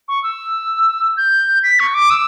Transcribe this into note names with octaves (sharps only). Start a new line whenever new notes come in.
C#6
E6
G6
B6
C#6
D6
E6